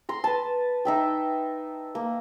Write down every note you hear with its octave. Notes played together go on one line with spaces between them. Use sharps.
A#5 C6
B4 A5
D#4 E5 G5
A#3